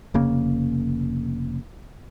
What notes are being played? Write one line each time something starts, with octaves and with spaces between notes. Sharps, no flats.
F1 C#3 A#3